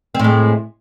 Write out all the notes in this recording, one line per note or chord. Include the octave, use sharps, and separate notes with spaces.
A2 G#3 C4